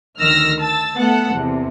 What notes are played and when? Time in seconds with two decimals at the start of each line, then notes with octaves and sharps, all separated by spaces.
0.20 D2 D#3 E6 F6 A#6
0.60 A5 E6 A6
0.98 A3 B3 A4 F#5
1.33 E2 C3